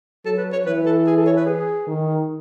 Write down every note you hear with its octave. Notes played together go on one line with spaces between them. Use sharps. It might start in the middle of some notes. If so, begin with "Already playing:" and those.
F#3 A4
B4
C#5
E3 B4
A4
G#4
A4
C#5
B4
G#4
D#3